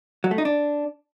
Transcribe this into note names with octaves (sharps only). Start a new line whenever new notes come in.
F#3
A3
D#4
D4